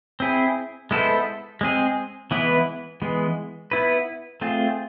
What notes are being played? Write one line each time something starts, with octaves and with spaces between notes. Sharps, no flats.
C4 E4 G#4
G#3 B3 E4 A4 C5
G#3 C4 G#4
E3 G#3 B3 E4 B4
E3 G#3 B3
B3 E4 B4
A3 C4 F4 G#4